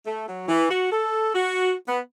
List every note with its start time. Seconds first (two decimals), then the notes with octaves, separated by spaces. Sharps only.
0.06 A3
0.28 F#3
0.48 E3
0.71 F#4
0.92 A4
1.35 F#4
1.88 B3